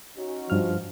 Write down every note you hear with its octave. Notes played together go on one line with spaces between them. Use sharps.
C#4 D#4 F#4
G2 F3 F6